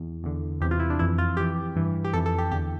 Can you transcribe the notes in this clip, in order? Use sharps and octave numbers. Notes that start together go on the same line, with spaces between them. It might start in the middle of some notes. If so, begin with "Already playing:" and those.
Already playing: E2
E2 D3
E2 C3 E3 G4
F4
E4
D4
F2 E3 E4
F4
F2 E3 G4
G2 E3
G4
F2 E3 A4
A4
G4
E2 D3 G4